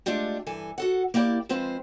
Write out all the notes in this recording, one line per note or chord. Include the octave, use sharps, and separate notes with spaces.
G#3 A3 D4 F4 G4
G2 E3 A4 G#5
F#4 A4 F#5
A#3 E4 G4 D5
F3 G#3 C4 F4 B4 C5